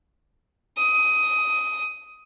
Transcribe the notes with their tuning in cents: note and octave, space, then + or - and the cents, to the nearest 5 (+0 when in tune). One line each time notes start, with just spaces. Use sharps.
D#6 +15